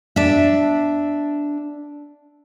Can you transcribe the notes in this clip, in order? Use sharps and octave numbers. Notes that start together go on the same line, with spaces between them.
D4 E5